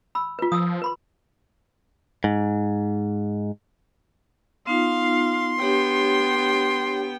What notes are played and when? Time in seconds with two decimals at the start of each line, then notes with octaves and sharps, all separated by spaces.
0.15 B5 E6
0.39 F4 B4
0.52 F3 D#6 E6
0.82 B4 B5 C6
2.24 G#2
4.67 B3 D#4 F4 F5 C6
5.60 B3 D4 G4 C#5 G5